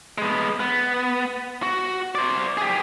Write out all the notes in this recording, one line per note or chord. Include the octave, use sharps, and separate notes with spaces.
G#3 B3
B3
F#4
C5 D5
G4 G#4